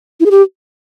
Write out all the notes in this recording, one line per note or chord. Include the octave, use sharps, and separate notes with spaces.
E4
G#4
G4